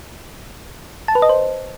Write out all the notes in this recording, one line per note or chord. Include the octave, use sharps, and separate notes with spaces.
A5
B4
D#5
C5